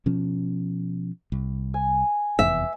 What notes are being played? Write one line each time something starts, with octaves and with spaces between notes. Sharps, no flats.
B2 F3 C#4
C2
G#5
F1 E2 E5